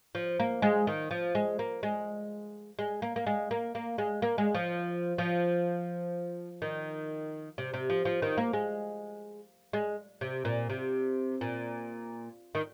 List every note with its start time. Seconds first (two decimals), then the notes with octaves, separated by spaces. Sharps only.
0.15 F3
0.40 A#3
0.62 G#3
0.87 D#3
1.11 F3
1.35 G#3
1.59 A#3
1.83 G#3
2.79 G#3
3.02 A#3
3.16 A#3
3.27 G#3
3.51 A#3
3.75 A#3
3.98 G#3
4.22 A#3
4.38 G#3
4.55 F3
5.18 F3
6.62 D#3
7.58 C3
7.74 C3
7.90 F3
8.05 F3
8.22 D#3
8.37 A#3
8.53 G#3
9.73 G#3
10.21 C3
10.45 A#2
10.70 C3
11.41 A#2
12.55 D#3